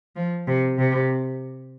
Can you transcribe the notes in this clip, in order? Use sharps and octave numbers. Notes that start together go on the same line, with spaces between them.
F3
C3
C3